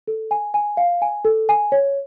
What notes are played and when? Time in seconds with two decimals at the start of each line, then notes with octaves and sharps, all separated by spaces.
0.08 A4
0.31 G#5
0.54 G#5
0.77 F5
1.02 G#5
1.25 A4
1.49 G#5
1.72 C#5